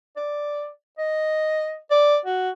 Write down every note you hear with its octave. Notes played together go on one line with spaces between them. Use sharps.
D5
D#5
D5
F#4